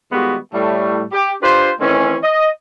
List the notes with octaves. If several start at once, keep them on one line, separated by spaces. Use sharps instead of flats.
D#3 G3 G#3 B3 F4 F#4
A2 G3 A3
G4
D4 F4 G4 B4 C5
D#3 E3 A3 C4 C#4
D#5